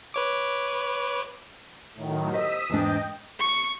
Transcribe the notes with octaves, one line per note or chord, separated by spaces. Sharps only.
B4 C#5 D6
A2 D#3 F#3
G4 C5 D#5 D#6 E6 B6
E2 G#2 D4 D#5 G5
C#6